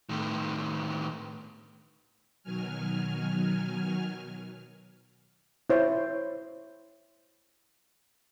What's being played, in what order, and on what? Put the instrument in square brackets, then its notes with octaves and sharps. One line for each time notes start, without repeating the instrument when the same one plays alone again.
[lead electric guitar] A2 D#3
[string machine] B2 D#3 F#3 G#5 F6
[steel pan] E4 C5 C#5